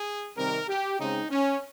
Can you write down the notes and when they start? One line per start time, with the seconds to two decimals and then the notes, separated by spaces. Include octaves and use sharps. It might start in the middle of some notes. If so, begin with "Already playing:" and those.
Already playing: G#4
0.37 C3 D#3 G3 C4 A#4
0.68 G4
0.99 C#3 G#3 C4 D#4
1.30 C#4